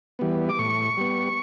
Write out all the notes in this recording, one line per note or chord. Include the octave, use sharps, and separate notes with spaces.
E3 G3 B3
D6
A2 C#6
G3 B3